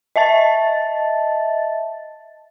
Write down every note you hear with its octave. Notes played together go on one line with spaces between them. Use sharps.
D#5 E5 A5 A6